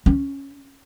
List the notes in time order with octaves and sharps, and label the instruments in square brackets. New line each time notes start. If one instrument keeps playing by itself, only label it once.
[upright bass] C#4